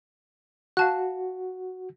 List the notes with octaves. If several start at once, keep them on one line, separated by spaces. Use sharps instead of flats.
F#4 F5 A5 F#6